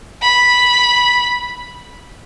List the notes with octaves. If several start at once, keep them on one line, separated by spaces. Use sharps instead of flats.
B5